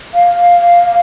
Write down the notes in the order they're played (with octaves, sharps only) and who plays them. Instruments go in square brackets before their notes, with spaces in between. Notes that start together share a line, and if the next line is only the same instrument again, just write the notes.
[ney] F5